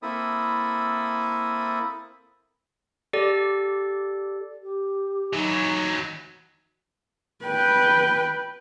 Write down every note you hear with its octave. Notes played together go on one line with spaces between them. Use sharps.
A#3 C4 E4 A4 B5 D#6
G4 A4 D5
G4
E3 F#3 D#4
B4 G5